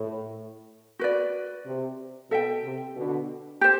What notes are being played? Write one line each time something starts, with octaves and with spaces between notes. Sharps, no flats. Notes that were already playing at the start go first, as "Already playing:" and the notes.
Already playing: A2
F#4 B4 D5
C3
B2 A4 E5 G5
C3
B2 D3
G4 C5